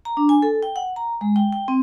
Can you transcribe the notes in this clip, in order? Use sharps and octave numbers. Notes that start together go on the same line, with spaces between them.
A#5
D4
G#5
A4
G5
F#5
A#5
G#3
G5
G5
C4